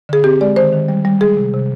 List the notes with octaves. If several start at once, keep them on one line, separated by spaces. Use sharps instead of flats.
D3 G#4
C4 G4
G#3 D5
D#3 C5
D#3
G3
G3
G#3 G#4
C3
C3